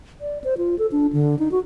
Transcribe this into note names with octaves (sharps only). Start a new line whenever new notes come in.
D5
C5
F4
A4
D4
D3
D#4
F#4